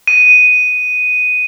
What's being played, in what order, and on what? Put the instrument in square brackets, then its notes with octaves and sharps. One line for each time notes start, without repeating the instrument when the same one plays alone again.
[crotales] D#7